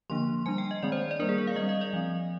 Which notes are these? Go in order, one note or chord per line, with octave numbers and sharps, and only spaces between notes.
D3 F3 A#3 D4 C6
G3 D4 G#5
G5
D#5
D#3 G#3 C4 D5
C5
D5
G3 A#3 D4 A#4
G#4
A#4
F5
G3 D#5
C4
D#5
D5
F3 C4